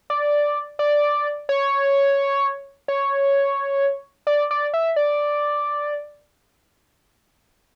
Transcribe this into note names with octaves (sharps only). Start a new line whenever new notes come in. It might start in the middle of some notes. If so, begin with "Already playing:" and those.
D5
D5
C#5
C#5
D5
D5
E5
D5